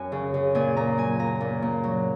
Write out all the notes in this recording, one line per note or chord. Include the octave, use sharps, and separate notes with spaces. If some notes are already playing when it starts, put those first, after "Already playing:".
Already playing: F#2 F#5 G#5
C#3
C#3
A#2 G#5
A#2 A#5
F#3 G#5
A#2 A#5
A#2
A#2
F#3